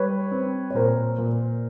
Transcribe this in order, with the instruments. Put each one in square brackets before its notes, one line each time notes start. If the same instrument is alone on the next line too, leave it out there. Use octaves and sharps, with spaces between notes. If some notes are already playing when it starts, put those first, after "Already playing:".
Already playing: [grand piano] G3 [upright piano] B4 C#5
[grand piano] C4
[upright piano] C#5
[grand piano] A#2 [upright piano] A#4 C5
[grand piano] A#2